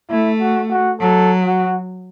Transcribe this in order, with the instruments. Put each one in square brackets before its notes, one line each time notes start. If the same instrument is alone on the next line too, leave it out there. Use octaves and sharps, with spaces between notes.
[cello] A3 [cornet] E4
[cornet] F#4
F#4
[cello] F#3 [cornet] A4
[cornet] F#4